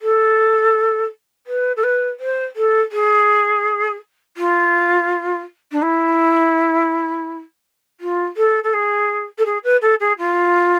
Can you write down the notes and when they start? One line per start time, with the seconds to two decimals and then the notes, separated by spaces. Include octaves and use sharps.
0.02 A4
1.47 B4
1.77 A4
1.83 B4
2.20 C5
2.56 A4
2.92 G#4
4.37 F4
5.72 D4
5.82 E4
8.00 F4
8.37 A4
8.64 A4
8.74 G#4
9.38 A4
9.46 G#4
9.64 B4
9.82 A4
10.00 G#4
10.19 F4